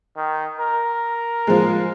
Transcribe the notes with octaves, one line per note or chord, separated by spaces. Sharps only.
D#3
A#4
F3 G#3